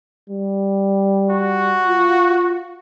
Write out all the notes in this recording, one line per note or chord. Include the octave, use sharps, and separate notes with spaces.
G3
F#4
F4